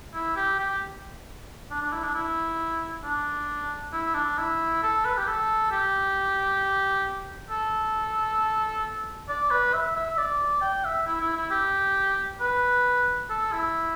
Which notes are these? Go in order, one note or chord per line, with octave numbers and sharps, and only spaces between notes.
E4
G4
G4
D4
D4
E4
D4
E4
D4
E4
D4
E4
A4
B4
G4
A4
G4
A4
D5
B4
E5
E5
D5
G5
E5
E4
E4
E4
G4
B4
A4
E4